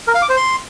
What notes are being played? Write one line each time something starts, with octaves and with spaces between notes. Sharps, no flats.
A#4
F5
D6
C5
C6